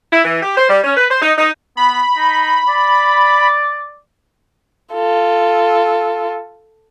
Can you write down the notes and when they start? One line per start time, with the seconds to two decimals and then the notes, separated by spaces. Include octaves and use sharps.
0.12 E4
0.25 E3
0.43 G4
0.57 C5
0.69 G3
0.84 C#4
0.97 B4
1.10 C5
1.22 D#4
1.38 D#4
1.77 B3 B5
2.17 D#4
2.69 D5
4.94 F4 A4